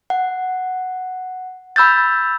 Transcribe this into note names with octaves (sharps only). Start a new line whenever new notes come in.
F#5
B5 E6 G6 A6